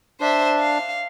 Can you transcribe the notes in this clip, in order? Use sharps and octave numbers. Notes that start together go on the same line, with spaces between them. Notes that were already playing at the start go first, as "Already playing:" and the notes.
D4 C5 E5
F5